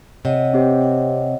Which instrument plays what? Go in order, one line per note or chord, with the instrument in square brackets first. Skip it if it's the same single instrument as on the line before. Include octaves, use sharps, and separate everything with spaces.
[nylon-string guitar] C3 [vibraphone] C#5 D#5 F#5
[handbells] C4 G4 C5